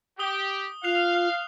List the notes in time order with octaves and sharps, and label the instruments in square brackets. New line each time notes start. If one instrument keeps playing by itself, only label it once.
[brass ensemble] G4 [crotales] D#6 G7
[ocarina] F4 [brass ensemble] F5 [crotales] F#6 C7 F7